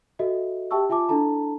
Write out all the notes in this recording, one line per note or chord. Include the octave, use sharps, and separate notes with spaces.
F#4 A4 D#5 E5
G4 E5 G5 A5 C#6 E6
F4 E5 G#5 A5 D6
D4 E4 A4 A5 A#5